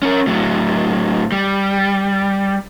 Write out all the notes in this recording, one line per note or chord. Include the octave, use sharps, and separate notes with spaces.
C#4 A#4
A2 F#3
G3